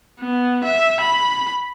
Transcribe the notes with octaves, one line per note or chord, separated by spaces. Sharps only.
B3
E5
B5